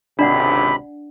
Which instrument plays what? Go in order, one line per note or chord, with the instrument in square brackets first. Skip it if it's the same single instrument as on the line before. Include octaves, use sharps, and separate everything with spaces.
[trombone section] G#1 C#2 C3 [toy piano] D4 D5 F#5 [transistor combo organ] B5